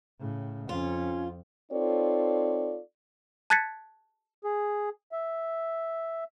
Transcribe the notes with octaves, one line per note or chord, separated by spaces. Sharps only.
A2 C#3
F2 C#4 F4
C4 D#4 F4 A4 C#5 D5
A5 F#6 G#6 A6 B6 C#7
G#4
E5